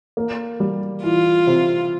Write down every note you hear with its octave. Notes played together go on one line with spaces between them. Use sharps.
A#3
G3
E3 F4
C3